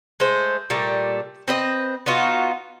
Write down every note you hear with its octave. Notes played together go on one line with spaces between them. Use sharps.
G#3 A3 C5
A#2 G3 A3
C4 B4 D#5
B3 D#4 F4 F#4